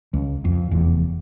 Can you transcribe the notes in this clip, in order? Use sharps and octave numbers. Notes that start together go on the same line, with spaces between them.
C#2
F2
F1 E2